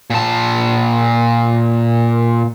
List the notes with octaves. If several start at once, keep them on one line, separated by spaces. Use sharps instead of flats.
A#2 A5